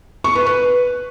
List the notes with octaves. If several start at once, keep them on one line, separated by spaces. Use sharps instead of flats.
C#6
B4
B4